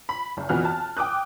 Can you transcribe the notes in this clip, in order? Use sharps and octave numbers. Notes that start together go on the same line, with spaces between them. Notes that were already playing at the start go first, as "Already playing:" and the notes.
B5
F#1
F2 B2 E3 F#4 F6 F#6
A5
G5 D6 D#6 F#6